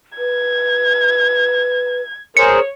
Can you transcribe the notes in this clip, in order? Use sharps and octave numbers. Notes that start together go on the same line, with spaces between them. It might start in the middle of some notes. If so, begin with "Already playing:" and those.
B4 G#6
G#4 A#4 C5 C#5 C#7